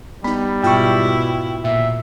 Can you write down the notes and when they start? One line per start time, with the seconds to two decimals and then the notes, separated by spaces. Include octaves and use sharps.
0.24 G3 B3 D#4 B5
0.63 G#2 B2 E4 F4 G5 C#6 F6
1.64 G1 A#2 E5